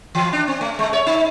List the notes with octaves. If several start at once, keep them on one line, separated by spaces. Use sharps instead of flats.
E3
D4
C4
A3
G#3
C#5
D#4